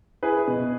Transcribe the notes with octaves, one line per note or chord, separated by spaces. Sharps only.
E4 G#4 B4
B2